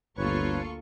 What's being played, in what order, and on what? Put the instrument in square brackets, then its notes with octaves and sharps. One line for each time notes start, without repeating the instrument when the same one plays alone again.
[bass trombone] G1 [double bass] D2 A#3 [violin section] F4 A4 C#6 [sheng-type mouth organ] B4 C#5